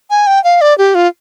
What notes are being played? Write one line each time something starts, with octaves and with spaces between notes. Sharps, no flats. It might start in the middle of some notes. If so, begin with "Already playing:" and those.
G#5
G5
F5
D5
G4
F4